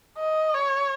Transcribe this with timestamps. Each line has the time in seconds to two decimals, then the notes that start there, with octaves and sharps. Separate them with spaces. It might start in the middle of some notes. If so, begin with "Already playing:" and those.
0.18 D#5
0.54 C#5